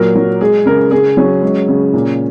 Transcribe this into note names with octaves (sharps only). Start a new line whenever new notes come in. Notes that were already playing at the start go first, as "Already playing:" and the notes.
Already playing: A#2 F#3 A#4
F#3
G#3 G#4
C#3 A#4
C#3 G#4
F#3 C#4
G#3
C#3
A#2